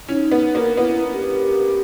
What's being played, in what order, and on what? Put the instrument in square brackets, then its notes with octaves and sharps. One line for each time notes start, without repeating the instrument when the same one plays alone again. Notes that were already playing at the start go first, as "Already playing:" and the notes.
[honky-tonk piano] C#4 [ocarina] E4
[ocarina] D#4
[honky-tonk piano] B3
A#3
[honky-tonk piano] B3 [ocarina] E4
[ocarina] G4